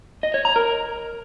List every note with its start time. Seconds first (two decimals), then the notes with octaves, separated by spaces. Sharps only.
0.23 D#5
0.34 C#5
0.45 A#5
0.56 A#4